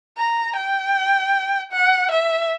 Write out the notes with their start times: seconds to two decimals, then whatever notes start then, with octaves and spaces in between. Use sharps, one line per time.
0.18 A#5
0.57 G5
1.72 F#5
2.11 E5